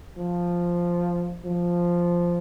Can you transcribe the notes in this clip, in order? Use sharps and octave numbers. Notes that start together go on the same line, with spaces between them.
F3
F3